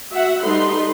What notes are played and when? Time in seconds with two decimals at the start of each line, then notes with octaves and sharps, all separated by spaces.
0.11 F#4 E5 F#5
0.41 G3 D#4 A4 B4 C6